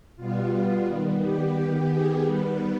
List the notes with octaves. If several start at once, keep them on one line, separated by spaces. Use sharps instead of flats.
B2 G3 B3 F4
D#3 G3 B3
G4
D#3 B3 G4
G#4
D#3 G3 B3 B4